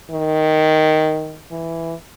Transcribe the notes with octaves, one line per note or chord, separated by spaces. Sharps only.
D#3
E3